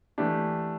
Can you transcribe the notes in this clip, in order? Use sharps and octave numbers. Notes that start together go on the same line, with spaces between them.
E3 A3 D4 G4